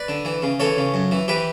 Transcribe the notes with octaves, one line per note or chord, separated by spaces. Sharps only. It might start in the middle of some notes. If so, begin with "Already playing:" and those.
Already playing: B4 D5
D3
E3
C#3
E3 A4 C#5
C#3
F#2
E3
E3 G4 B4